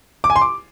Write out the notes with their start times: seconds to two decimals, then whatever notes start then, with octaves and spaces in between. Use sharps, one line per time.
0.24 D6
0.30 G#5
0.36 C6
0.41 D6